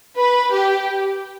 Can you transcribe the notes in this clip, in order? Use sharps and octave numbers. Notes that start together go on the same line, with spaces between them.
B4
G4